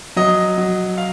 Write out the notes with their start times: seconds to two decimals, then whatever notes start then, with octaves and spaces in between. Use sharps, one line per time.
0.16 F#3 D#5
0.58 F#3
0.98 F5